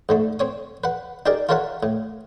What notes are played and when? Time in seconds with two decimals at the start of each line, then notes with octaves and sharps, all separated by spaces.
0.09 G#2 D3 A3
0.39 C4 C#5 D#6
0.84 B4 F#5
1.26 D#4 G4 G#4 A#4 D5
1.49 F4 A4 A#4 C#5 E5 F#5
1.83 A2